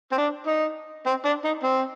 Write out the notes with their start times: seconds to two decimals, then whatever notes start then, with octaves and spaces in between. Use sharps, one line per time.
0.12 C4
0.18 D4
0.47 D#4
1.06 C4
1.25 D4
1.45 D#4
1.64 C4